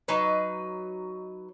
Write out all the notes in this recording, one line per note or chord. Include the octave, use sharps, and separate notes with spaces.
F#3 D#4 B4